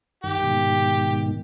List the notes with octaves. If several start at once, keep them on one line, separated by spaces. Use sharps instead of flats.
G2 D#3 G4
G#2 B2 D#3